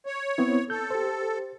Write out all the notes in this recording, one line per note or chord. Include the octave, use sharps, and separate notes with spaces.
C#5
B3 C4 E4
A4 G6
G4 C5